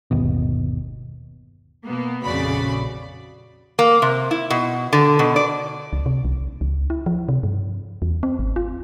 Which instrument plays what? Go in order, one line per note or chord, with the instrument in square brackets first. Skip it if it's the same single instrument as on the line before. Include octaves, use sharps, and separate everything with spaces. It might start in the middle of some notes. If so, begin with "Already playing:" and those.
[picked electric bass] G1 D#2 B2
[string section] B2 A#3 B3
A#1 F2 C#3 F#4 D5 B5
[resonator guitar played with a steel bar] A#3
C3
E4
B2
D3
B2
D5
[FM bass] C#2
C3
C2
C#2
E4
F3
C3
G2
E2
C4
G#1
F4